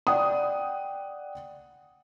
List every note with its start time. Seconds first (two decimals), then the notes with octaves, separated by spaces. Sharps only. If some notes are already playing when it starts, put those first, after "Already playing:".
0.07 D5 F#5 G5 D#6